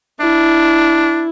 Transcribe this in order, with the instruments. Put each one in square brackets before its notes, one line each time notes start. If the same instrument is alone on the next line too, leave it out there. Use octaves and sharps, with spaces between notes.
[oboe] D4 [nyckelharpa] E4